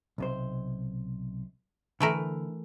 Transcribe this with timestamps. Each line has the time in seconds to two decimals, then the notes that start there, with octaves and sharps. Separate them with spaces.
0.18 B1 C3 C5
2.00 D3 E3 A3 A#4